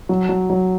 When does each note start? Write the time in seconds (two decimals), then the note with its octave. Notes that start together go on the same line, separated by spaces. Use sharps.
0.09 F#3
0.29 F#3
0.50 F#3